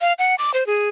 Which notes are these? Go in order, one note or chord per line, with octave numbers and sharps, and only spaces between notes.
F5
F#5
D6
C5
G#4